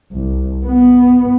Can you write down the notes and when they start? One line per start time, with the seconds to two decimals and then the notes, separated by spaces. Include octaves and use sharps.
0.12 C2
0.67 B3